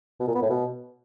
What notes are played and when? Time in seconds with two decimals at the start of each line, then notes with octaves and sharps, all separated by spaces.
0.20 B2
0.28 A#2
0.35 B3
0.42 A2
0.50 B2